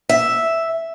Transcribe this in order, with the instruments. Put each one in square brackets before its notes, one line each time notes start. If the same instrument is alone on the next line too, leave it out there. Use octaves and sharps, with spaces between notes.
[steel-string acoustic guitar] E5